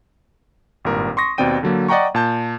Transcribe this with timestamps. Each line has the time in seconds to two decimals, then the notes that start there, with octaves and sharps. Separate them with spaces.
0.85 G#1 G2 A#2 A#4
1.17 C6 C#6 D#6 A#6
1.38 D#2 B2 C4 D5 G5 D#7
1.63 D3 F#3 A#3
1.88 D5 D#5 F#5 G5 A#5 C#6
2.15 A#2 A5 G6